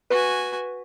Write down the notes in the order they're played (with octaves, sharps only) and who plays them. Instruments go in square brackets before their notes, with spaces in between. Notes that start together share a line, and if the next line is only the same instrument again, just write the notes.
[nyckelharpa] F#4 G#5 [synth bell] B4